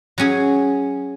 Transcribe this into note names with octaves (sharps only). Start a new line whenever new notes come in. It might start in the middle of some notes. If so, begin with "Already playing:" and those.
F#3 C#4 G#4